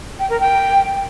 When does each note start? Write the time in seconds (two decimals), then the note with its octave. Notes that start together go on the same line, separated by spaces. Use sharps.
0.19 G5
0.30 A#4
0.40 G5